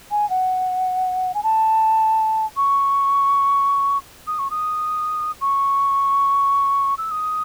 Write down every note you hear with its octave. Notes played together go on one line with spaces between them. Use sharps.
G#5
F#5
G#5
A5
C#6
D#6
C#6
D#6
C#6
E6
D#6